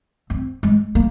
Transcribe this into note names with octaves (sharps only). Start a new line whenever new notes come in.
C4
G#3
A#3